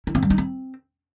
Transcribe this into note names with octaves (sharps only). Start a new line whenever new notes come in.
E4
C4
G3
D#4
C4